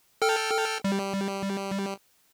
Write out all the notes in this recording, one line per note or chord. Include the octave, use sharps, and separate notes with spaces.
A4 G5 F6
G3